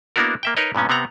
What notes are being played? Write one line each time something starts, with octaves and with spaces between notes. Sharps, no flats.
A#3 B3 D4 E4 F#4 A#4
A#3 E5 G5
D#4 A#4 B4 C#5 D#5
G2 A#2 B3 C#4
C3 B3 C4 F#5 A#5